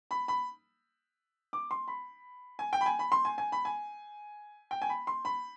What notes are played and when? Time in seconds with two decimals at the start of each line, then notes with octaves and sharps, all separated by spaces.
0.11 B5
0.28 B5
1.53 D6
1.71 C6
1.88 B5
2.59 G#5
2.73 G5
2.81 B5
2.86 G#5
2.99 B5
3.12 C6
3.25 G#5
3.38 G#5
3.52 B5
3.65 G#5
4.71 G5
4.82 G#5
4.89 B5
5.07 C6
5.25 B5